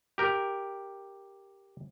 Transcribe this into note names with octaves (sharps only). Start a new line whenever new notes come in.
G4 A#4 G5